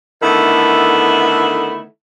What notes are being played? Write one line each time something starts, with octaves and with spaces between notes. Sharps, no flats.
D3 D#3 A3 B3 E4